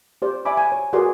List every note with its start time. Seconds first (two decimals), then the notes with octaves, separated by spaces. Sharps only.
0.22 G4 C5 D5
0.45 D5 E5 G#5 B5 D6
0.57 G#5
0.72 C#5
0.93 F#4 G#4 A#4 B4 D5 C6